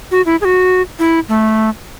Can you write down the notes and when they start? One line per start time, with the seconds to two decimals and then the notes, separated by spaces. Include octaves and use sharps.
0.11 F#4
0.26 E4
0.41 G#4
0.45 F#4
0.99 E4
1.29 A3